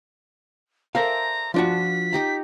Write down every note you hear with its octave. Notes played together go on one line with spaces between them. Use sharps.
A4 A#4 C5 D5 E5 F5 A#5
F3 D4 F4 F#4 B6
D#4 G4 A#5